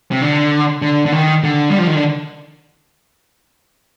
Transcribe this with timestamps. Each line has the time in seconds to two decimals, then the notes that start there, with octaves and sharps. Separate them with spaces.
0.11 C3
0.22 D3
0.82 D3
1.06 D3
1.12 D#3
1.43 D3
1.70 G3
1.78 F3
1.87 D#3
1.95 D3